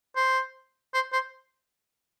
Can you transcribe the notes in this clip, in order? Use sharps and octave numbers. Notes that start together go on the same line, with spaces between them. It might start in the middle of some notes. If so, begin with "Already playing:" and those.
C5
C5
C5